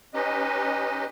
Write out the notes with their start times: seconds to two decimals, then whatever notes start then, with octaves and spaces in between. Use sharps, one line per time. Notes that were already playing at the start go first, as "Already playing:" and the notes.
0.14 C#4 D#4 G4 B4 D#5